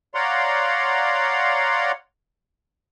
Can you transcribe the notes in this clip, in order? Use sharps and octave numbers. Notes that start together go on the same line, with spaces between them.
C#5 D5 F5 F#5 A#5 C6